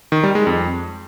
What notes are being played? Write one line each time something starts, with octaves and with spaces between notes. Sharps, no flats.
D#3
G3
G#3
F2